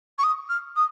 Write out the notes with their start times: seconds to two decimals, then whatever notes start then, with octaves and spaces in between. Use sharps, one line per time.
0.18 C#6
0.23 D#6
0.49 F6
0.76 D#6